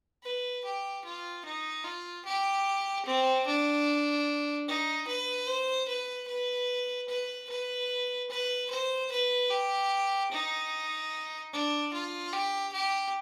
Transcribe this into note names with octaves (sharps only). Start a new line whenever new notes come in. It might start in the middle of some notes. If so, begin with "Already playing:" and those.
B4
G4
F4
D#4
F4
G4
C4
D4
D#4
B4
C5
B4
B4
B4
B4
B4
C5
B4
G4
D#4
D4
F4
G4
G4